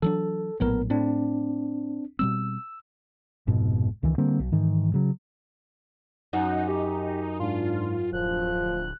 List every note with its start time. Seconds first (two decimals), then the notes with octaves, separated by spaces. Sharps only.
0.02 E3 F#3 D4 A4
0.60 A#1 A2 F#3 B3 A#4
0.90 A2 C4 D4
2.19 B2 G3 C4 E6
3.47 F1 G#2 B2
4.03 C#2 D#3 E3
4.18 D3 G3 A#3 C4
4.39 B1
4.52 G#2 D#3 E3
4.94 C#3 F#3
6.33 F#2 D#4 F#5
6.68 G4
7.40 G#2 D4 F4
8.13 D1 F3 F#6